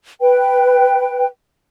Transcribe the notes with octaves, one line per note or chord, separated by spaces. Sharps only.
B4 G5